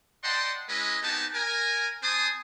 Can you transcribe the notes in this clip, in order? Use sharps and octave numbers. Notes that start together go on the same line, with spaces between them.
D5 D#5 F#5 G5 A5 C6
G#3 C#4 E4 B4 D#5
B3 C4 D#4 G4 G#5 A5
A#4 G#5
C4 C5 G#5 A5 C6 D#6